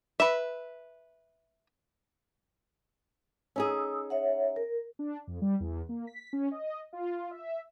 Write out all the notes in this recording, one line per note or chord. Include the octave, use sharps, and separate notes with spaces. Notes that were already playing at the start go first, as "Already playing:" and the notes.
B4 E5
C#4 D#4 G#4 D#6 E6
C#5 E5 F#5
A#4
D4
F2
G3
E2
A#3
B6
C#4
D#5
F4
E5